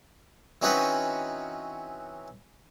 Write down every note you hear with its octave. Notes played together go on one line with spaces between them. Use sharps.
E3 C4 C#4 D#4 F#4 B4